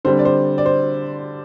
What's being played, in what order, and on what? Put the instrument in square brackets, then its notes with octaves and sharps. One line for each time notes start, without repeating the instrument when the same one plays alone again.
[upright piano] D3 G3 C4 C5
D5
C5
D5
C5